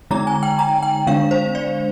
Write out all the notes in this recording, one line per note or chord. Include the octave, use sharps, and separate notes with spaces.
D3 G#3 D#4 A#5
G#5
G5
A#5
G5
D3 G#3 D4 F5
C5
D5